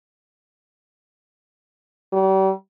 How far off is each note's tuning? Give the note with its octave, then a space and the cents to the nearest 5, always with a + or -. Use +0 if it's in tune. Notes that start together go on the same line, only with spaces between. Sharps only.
G3 -40